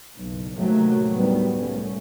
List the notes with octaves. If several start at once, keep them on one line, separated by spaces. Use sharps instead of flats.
F#1 B1
A1 D#2 C3 D#3 F#3 A3
D2 A2 D#3 G3 B3
C2 A3 C#4